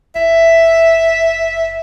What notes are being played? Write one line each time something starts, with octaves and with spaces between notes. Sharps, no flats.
F#1 E5